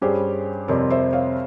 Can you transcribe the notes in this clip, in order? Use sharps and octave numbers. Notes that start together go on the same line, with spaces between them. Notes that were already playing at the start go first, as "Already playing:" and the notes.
G2 G3 C#4 G4 G#4 C5
F2 C3 G3 C4 A#4 C#5
C5 E5
C#5 F5